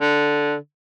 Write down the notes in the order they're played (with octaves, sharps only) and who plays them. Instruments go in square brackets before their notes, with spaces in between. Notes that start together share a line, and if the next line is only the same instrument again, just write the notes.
[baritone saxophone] D3